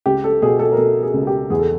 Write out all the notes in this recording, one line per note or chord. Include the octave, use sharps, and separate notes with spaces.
C#2 G4
A4
B2 G#4
A4
A#4
B2 A4
G#4
C#2
G4
E2 G#4
A4